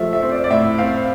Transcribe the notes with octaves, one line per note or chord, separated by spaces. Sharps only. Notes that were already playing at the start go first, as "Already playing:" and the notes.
Already playing: F3 A3 E5
E5
C4
D5
D5
A2 E5
C4 F5